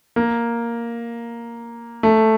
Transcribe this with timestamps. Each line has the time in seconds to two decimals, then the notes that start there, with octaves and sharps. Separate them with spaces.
0.16 A#3
2.03 A3